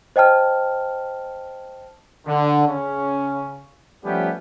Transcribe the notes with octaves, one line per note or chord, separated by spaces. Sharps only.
C5 D#5 G5 A5 F6
D3
C#3 C#4
F3 G3 A3 B3 C#4 G4